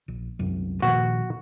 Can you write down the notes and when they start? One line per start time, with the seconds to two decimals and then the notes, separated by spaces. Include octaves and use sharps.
0.08 A#1
0.39 C2 F#2
0.82 A#2 D#3 F3 F#4